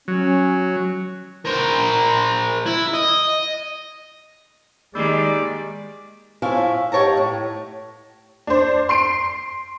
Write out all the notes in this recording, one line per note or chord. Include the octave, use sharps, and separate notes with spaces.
F#3 C#4
A#4 C5
E4
D#5
D#3 G3 G#3 A#3 G4 D5
A2 F3 C#4 E4 F5 G#5
G#2 G4 C#5 A5 A#5
A2
D4 C5
C6 C7 D7